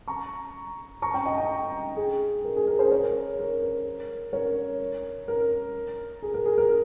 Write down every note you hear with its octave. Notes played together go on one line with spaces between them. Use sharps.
A#5 C#6
A#5 C#6
G5 A#5
D#5 G5
D#5 G5
G#4
A#4
G#4
A#4
G#4 C5
A#4 C#5
A#4
A#4
A#4 C#5
A#4
G#4
A#4
G#4
A#4